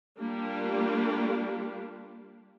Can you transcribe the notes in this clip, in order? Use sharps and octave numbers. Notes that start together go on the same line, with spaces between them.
G3 A#3 D4 F4 G4